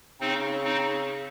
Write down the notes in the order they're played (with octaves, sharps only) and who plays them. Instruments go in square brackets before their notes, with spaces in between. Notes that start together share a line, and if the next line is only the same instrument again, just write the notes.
[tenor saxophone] C#3 [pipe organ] C4 D#4
[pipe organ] C4 D#4